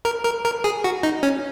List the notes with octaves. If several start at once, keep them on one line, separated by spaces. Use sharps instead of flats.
A#4
A#4
A#4
G#4
F#4
D#4
C#4